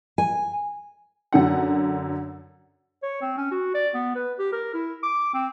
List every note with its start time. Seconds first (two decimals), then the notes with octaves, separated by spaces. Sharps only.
0.18 G#5
1.33 F#2 D3 F#5
3.03 C#5
3.22 C4
3.38 C#4
3.51 F#4
3.74 D5
3.95 B3
4.16 B4
4.39 G4
4.53 A#4
4.74 E4
5.03 D6
5.34 C4